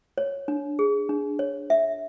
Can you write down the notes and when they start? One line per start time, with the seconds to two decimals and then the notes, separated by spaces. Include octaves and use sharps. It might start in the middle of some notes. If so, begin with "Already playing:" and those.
0.18 C#5
0.48 D4
0.79 G#4
1.09 D4
1.39 C#5
1.70 E5